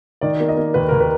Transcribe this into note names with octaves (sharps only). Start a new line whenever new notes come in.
D#3 D5
A#3
D#5
A#3
D#2 B4
A#4
D#2
B4